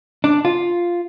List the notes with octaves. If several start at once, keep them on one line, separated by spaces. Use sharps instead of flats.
D4
F4